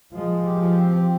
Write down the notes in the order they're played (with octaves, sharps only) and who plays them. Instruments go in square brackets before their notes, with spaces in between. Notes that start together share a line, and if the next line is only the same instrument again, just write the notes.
[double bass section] F3 [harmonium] G#3
[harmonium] G4
[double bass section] F3
[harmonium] C4